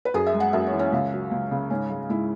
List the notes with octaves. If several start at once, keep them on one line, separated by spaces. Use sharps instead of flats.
B4
F#2 G#4
E5
G#3
F#5
F#2 E5
C#5
E3
C#4
C#2
F#3
C#2
C#3
G#2 C#4
G#3
G#2 E4